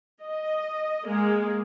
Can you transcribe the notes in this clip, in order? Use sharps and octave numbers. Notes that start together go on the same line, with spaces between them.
D#5
G#3 A#3 G#4